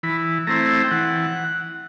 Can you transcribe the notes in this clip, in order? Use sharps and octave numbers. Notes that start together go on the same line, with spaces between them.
E3 B5
A3 C4 E4 A#5
G5
E3 F#5